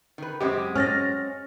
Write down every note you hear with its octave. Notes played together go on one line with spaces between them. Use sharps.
D#3 B4
F#2 G#3 C4 G4
C#4 F6 A6 A#6